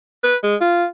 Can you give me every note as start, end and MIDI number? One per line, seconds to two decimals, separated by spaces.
0.24 0.36 71
0.43 0.55 56
0.61 0.85 65